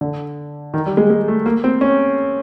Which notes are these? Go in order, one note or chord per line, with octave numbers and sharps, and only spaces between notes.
D3
D#3
G3
G#3
G#3
A3
A#3
C4
C#4